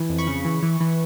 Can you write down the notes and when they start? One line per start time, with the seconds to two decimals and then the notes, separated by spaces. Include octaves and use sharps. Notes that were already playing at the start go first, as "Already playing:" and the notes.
Already playing: E3
0.09 F2
0.18 B5 C#6
0.27 C#3
0.45 E3
0.63 E3
0.80 E3